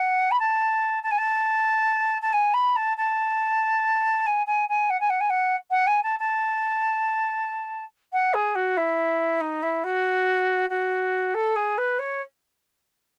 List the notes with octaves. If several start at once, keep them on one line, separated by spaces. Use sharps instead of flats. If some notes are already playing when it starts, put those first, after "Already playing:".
Already playing: F#5
B5
A5
A5
G#5
A5
A5
G#5
B5
A5
A5
G#5
G#5
G#5
F#5
G#5
F#5
G#5
F#5
F#5
G#5
A5
A5
F#5
G#4
F#4
E4
D#4
E4
F#4
F#4
A4
G#4
B4
C#5